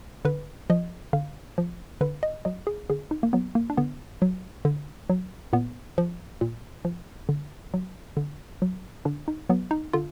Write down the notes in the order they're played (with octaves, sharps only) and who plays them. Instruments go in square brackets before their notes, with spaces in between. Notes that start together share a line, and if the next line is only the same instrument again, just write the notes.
[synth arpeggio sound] D3 B4
F3 D#5
D3 F5
F3
D3 B4
D#5
F#3 D#5
G#4
D3 G#4
D#4
A#3
F#3 B3
A#3
D4
D3 B3
F#3
D3
F#3
A#2 B3
F3
A#2
F3
D3
F#3
D3
F#3
D3 D4
D#4
F#3 B3
D#4
D3 F4